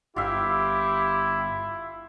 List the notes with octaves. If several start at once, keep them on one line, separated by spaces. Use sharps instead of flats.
G1 E4 F4 G4 E5